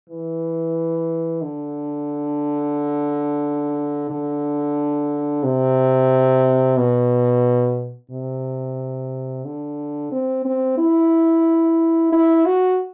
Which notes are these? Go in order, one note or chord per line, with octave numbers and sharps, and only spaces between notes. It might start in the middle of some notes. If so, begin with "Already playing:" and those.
E3
D3
D3
C3
B2
C3
D3
C4
C4
E4
E4
F#4